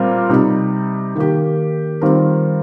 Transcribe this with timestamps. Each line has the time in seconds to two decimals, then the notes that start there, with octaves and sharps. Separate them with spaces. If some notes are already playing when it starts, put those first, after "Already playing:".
Already playing: A#2 G3 C4 F4 A#4
0.30 C3 G3 D#4
1.15 D#3 A#3 G4
2.01 D#3 G3 C4 F4 A#4